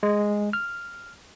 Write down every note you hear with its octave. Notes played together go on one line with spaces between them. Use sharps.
G#3
F6